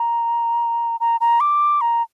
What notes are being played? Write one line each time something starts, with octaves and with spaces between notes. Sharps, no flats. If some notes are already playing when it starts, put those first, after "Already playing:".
Already playing: A#5
A#5
A#5
D6
A#5